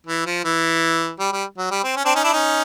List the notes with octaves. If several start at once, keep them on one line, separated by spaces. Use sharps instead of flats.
E3
F3
E3
G3
G3
F#3
G3
C4
C#4
C4 D4
C#4 D#4
D4 E4
C#4 D#4